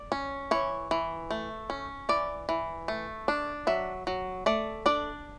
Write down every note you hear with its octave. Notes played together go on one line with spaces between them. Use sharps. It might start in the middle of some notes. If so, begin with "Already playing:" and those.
Already playing: D5
C#4
E3 C#5
E3
A3
C#4
E3 D5
E3
A3
D4
F#3 E5
F#3
A3 D5
D4 D5